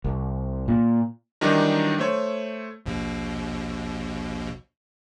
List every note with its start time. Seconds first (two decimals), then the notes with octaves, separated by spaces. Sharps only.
0.04 C2
0.68 A#2
1.41 D#3 E3 F#3 G3 D4 D#4
1.98 A3 C5 C#5
2.86 A#1 D#2 B2